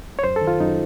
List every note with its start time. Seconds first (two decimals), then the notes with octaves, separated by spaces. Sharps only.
0.19 C#5
0.24 F#2 C5
0.36 A4
0.41 D#3
0.47 F4
0.60 F#2 D#4